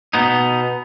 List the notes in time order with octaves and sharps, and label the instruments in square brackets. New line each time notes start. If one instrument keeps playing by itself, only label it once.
[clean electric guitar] B2 B3 D#4